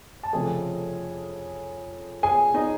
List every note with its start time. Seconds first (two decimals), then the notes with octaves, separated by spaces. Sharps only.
0.23 A5
0.33 F1 F2 C#3 F3 A3 G#4 G#5
2.23 G#4 G#5
2.54 D#4 D#5